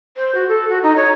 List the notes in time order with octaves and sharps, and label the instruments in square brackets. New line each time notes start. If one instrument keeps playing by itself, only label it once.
[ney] C5
F#4
A4
F#4
D#4
C#5